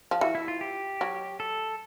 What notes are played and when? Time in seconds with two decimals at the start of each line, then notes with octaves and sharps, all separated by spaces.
0.11 F3
0.21 E3 F#4
0.35 E4
0.48 F4
0.61 G4
1.01 F#3
1.40 A4